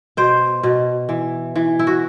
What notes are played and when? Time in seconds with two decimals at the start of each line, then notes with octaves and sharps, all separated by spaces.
0.17 B2 C5
0.63 B2
1.09 E3
1.56 E3
1.79 E4
1.87 F#4